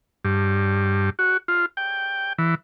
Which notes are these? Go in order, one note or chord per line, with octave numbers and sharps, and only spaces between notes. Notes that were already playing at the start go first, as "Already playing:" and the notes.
G2
F#4
F4
G5
E3